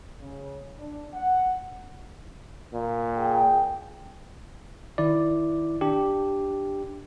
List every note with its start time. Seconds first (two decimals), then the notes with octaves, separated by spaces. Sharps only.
0.20 C#3
0.79 D4
1.14 F#5
2.73 A#2
3.17 G#4 G5
4.98 D#3 E4 D5
5.81 D4 G4